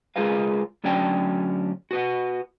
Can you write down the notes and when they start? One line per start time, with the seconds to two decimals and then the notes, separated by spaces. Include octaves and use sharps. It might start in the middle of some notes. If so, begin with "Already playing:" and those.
0.16 G#3 F4 G#4 A#4 B4 F5
0.84 D2 F#3 C#4 D4 G5
1.91 F#4 B4 F#5